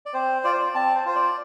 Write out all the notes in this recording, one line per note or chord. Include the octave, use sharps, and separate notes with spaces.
D5
C4 C5
F4 D5
C5
D5
C4 A5
C5
F4 C5
D5